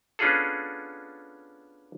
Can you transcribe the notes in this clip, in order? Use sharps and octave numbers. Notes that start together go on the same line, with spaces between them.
B3 C#4 D4 F4 G#4 A4